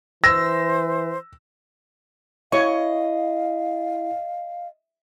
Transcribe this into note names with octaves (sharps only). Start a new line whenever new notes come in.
E3 C5 E6 A#6
E4 C#5 D#5 F5 C#6